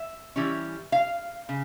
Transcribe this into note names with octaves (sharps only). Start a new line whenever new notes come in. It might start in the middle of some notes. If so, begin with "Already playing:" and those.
Already playing: E5
E3 G3 C#4
F5
C#3